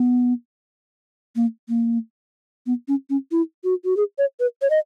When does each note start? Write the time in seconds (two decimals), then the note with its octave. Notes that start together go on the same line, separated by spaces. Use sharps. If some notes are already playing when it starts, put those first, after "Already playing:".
Already playing: B3
1.36 A#3
1.69 A#3
2.66 B3
2.88 C#4
3.10 C#4
3.32 E4
3.64 F#4
3.85 F#4
3.97 G#4
4.18 C#5
4.40 B4
4.62 C#5
4.70 D#5